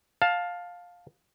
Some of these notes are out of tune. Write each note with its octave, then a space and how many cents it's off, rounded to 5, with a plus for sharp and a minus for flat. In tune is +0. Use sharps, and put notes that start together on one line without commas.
F5 +15 A5 +0